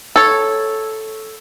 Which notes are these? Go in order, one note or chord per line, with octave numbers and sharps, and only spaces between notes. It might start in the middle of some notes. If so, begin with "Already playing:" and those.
A4 C#5